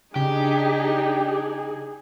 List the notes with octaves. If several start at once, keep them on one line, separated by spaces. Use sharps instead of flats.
C#3 D4 D#4 G4 G#4
G#4